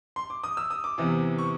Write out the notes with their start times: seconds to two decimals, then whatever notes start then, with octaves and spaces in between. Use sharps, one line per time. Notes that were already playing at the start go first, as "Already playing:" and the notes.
0.16 C6
0.30 D6
0.44 D#6
0.57 E6
0.70 D#6
0.84 D6
0.98 E2 C3 E3
1.38 C#6